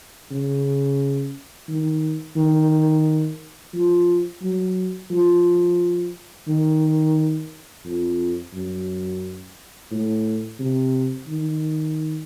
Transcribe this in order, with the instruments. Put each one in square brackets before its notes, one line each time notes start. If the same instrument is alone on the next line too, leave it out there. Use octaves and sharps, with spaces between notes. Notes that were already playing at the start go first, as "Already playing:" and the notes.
[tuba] C#3
D#3
D#3
F3
F#3
F3
D#3
F2
F#2
A2
C3
D#3